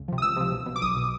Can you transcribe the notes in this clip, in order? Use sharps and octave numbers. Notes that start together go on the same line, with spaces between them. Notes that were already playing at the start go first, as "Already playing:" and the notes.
Already playing: C#2
C3 F3
D#6
C#2 E6
C3 F3
B1
B2
D6
B1 D#6
B2